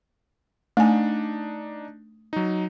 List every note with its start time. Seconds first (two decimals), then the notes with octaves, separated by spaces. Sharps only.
0.77 A3 D4 D#4 G#5
2.33 F#3 D#4